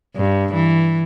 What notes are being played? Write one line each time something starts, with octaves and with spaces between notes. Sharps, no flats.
G2
E3